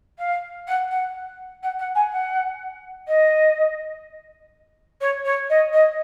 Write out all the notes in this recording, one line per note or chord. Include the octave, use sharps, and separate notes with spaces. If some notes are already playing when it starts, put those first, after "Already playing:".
F5
F#5
F#5
F#5
F#5
G#5
F#5
D#5
C#5
C#5
D#5
D#5